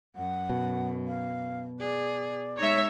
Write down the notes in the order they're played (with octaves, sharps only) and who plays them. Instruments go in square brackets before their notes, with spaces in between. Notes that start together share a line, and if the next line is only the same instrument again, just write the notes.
[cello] F#2 [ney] F#5
[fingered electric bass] B2
[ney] F5
[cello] G#4 [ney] D5
[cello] G#3 D#4 [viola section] C#5 E5